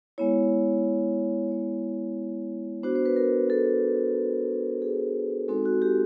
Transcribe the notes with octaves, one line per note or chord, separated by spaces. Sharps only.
G#3 B3 E4 C#5
C#5
B3 D4 F#4 C5
C5
B4
A#4
A4
G#4
G#3 C4 D#4 F#4 A4
F#4
G4